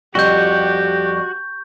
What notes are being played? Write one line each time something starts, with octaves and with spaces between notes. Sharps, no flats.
F2 G3 F#4 G4 C#6 G6